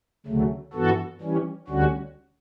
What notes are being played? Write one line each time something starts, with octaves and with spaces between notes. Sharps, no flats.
D2 C#3 F#3 A3
G2 E3 B3 F#4 A4
E3 G3 C#4
D2 D3 G3 C#4 F#4